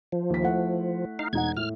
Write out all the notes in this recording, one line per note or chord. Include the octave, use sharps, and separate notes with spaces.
F3
D#2 B6
A3 E4 F#5
D#4 F5
E1 D#4 F#5 G#6
A2 F6